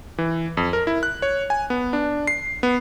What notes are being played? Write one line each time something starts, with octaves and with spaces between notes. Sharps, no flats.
E3
F2
A#4
E4
F#6
C#5
G#5
B3
D4
C7
B3